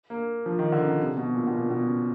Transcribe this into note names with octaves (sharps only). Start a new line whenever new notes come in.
A#3
F3
D#3
D3
C#3
C3
B2
A#2
B2
A#2
B2
C#3